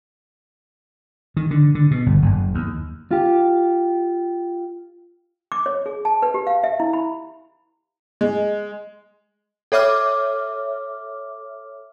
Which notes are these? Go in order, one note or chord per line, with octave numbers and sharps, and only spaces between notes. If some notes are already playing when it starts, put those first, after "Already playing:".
D#3
D3
D3
B2
G1
F#1
D#2
F4 G4
D6
C#5
G#4
A5
B4
G4
F5
E5
E4
B5
G#3
A4 C#5 E5 D6 F6